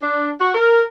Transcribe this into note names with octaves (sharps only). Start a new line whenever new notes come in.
D4
F#4
A#4